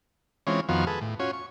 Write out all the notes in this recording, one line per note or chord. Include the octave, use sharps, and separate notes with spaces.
E3 G#3 C4 C#4 F4 C#5
F2 D#3 F3 B3 F#4 F5
G#4 A4 B4
A2
C#4 F4 F#4 C#5
C#6